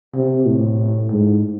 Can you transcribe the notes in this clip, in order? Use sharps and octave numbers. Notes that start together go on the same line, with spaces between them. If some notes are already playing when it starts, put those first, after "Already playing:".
C3
A2
G#2